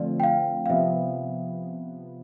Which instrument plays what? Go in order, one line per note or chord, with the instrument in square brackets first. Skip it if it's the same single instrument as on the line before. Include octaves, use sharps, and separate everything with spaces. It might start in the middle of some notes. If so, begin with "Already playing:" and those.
Already playing: [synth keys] D3 F3 A3 C4 F4 [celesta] D5
[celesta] G5
F5
F5
[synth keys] C3 F3 B3 [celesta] E5